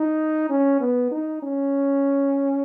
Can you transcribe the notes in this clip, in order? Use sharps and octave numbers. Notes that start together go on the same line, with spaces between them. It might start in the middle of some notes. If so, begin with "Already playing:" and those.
Already playing: D#4
C#4
B3
D#4
C#4